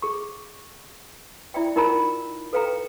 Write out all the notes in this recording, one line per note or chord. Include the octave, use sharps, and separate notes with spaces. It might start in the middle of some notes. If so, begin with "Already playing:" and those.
G#4 C#6
E4 D5 E5 G5
D#4 F4 A#4 G5 A#5 B5
A4 B4 F5 G5 A#5